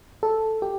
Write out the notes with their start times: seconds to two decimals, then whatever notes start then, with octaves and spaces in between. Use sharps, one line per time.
0.23 A4
0.62 G4